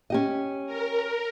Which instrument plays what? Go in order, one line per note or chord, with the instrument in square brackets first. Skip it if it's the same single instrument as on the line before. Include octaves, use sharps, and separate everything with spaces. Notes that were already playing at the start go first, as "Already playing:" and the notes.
[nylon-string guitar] C#4 G4 D#5
[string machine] A#4